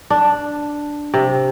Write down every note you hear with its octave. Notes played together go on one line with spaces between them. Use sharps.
D4
C3